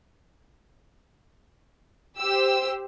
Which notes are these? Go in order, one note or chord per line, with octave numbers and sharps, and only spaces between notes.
G4 C5 E6